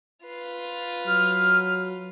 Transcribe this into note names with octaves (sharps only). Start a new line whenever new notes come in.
F4 B4
F#3 F6